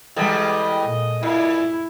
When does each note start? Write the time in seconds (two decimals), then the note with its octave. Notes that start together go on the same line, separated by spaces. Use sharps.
0.16 E2 G3 G#3 A4 D#5
0.83 A#2
1.23 A#2 E4